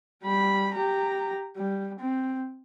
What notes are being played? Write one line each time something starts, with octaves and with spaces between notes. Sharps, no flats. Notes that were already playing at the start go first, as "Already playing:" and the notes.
G3 B5
G4 A#5
G3
C4